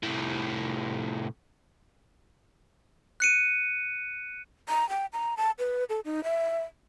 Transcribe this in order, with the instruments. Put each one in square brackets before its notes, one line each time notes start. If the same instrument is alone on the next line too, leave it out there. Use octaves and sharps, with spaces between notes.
[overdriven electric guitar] C2 A2
[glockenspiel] F#6 C#7 D#7
[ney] A#5
G5
A#5
A5
B4
A4
D#4
E5